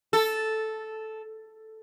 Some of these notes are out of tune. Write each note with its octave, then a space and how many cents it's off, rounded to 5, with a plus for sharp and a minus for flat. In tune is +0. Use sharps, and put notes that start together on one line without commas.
A4 -5